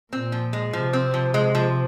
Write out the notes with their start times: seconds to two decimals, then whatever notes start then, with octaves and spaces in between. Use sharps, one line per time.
0.12 A#2 C4
0.32 F3
0.53 G#3
0.73 C3 F3
0.93 C4
1.14 F3
1.34 G#3
1.55 F3